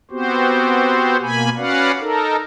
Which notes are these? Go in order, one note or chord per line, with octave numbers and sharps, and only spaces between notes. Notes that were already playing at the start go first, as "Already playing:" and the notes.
B3 C4 F#4 G4 C5
B2 A#3 G#5 B5
C#4 F#4 B4 D5 F5 F#5
D#4 A4 A#4